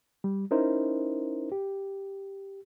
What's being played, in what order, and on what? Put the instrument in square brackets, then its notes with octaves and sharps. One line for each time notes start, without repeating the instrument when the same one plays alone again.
[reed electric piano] G3
C#4 D#4 E4 A#4 C5
G4